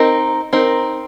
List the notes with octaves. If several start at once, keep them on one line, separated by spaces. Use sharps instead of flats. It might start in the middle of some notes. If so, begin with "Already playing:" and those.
Already playing: C4 D#4 A#4
C4 D#4 A#4